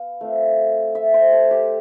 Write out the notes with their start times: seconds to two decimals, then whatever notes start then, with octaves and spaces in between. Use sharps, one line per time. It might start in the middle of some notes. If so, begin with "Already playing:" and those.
Already playing: B3 F5
0.21 A3 C4 F4
0.95 E5
1.14 C5
1.32 A4
1.51 G4